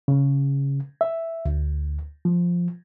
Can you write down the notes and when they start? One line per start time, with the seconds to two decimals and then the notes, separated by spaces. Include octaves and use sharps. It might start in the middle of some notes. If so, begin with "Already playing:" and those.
0.08 C#3
1.01 E5
1.46 D2
2.25 F3